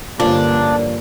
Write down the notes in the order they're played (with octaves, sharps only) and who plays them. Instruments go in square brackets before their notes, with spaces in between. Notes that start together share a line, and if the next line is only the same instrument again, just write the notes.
[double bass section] G2 D3 A#3 [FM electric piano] F3 C#4 [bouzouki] D4